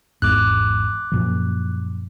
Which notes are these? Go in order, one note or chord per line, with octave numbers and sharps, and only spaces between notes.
G#1 E2 G#2 D6 F#6
F#2 A#2 F3